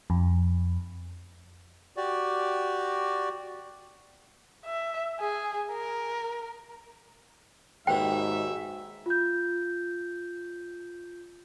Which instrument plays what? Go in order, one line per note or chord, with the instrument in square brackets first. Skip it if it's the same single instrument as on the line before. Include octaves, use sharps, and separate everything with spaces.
[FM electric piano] F2
[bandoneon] F#4 G4 D5
[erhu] E5
G#4
A#4
[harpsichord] D#2 B2 [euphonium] G#2 [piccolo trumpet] E5 [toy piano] G5
[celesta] F4 G6